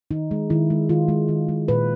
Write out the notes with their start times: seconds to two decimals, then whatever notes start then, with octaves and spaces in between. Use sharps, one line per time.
0.11 D#3 D#4
0.31 G#3
0.50 D#3 E4
0.70 G#3
0.89 D#3 F4
1.08 G#3
1.28 D#3
1.49 G#3
1.68 A#2 B4